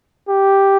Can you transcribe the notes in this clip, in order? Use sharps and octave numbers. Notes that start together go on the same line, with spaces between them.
G4